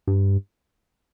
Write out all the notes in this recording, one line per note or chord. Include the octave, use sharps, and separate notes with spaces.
G2